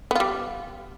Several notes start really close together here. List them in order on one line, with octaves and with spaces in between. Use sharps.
B3 F4 G3